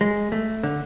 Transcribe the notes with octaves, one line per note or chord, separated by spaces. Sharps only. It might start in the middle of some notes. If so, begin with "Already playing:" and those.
G#3
A3
D3